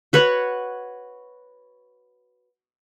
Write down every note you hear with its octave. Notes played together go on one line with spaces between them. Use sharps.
F#4 B4 C#5 F#5